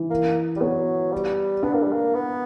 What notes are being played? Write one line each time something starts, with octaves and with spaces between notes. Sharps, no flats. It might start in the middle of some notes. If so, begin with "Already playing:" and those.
Already playing: E3
A#3
G3
F#3 B3
G3
B3 D4
A#3
G3
A#3
B3